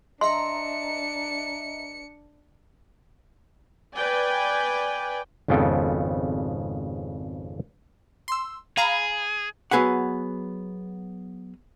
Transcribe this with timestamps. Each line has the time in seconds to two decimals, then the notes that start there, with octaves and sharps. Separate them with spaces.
0.21 D4 D#5 E5 A#5 C6 C#7
3.92 B4 D5 G5 G#5
5.48 G#1 F2 C#3 B3 A4 G5
8.28 C6 E6
8.77 G#4 F5 A#5 B5
9.71 F#3 B3 G#4 B4 F#5